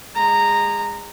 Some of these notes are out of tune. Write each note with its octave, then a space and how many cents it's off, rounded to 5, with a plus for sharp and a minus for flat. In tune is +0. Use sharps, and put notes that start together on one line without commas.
G#3 -30 A#5 -10